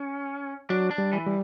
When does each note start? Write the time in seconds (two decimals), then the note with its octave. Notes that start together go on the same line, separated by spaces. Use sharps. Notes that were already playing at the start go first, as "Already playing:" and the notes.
Already playing: C#4
0.70 F#3 D4
0.91 D4
0.98 G3
1.13 E3
1.26 G3